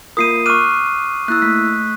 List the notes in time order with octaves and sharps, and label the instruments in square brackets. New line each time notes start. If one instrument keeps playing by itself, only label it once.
[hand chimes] A#3 F4 A#4 [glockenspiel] D#6 C7 D#7
[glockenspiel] C#6 D#7 [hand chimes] D6 F6 F#6
[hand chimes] A#3 E4 E6 [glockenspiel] F#6
[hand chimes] A3 B6